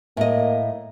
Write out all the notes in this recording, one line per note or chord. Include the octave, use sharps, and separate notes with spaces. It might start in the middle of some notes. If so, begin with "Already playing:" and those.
A2 A#3 D#5